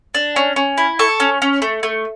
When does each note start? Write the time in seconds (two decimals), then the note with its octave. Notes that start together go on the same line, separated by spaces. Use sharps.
0.15 D4
0.36 C#4
0.56 C#4
0.78 E4
0.99 A4 C#6
1.20 C#4
1.42 C#4
1.62 A3
1.83 A3